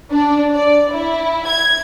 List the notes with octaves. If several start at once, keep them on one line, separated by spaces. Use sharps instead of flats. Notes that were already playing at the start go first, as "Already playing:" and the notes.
D4
D5
E4
G#6